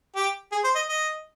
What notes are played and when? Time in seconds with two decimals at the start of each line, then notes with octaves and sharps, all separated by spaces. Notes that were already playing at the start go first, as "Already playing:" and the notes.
0.15 G4
0.52 G#4
0.64 C5
0.75 D#5
0.88 D#5